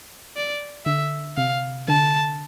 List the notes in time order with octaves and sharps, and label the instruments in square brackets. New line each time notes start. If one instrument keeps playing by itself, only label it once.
[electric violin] D5
[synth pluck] D3 [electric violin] E5
[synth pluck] C3 [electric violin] F5
[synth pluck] D3 [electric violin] A5